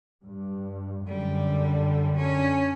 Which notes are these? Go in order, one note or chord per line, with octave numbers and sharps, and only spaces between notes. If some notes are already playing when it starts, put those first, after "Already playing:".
G2
F#2 D3 G3
C#4